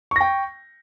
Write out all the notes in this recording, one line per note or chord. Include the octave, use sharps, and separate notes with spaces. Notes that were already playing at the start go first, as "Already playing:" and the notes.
G5 C#6 A#6